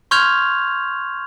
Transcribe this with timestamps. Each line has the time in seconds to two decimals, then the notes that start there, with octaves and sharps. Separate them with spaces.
0.11 C6 C#6 F6 G6 G#6 F7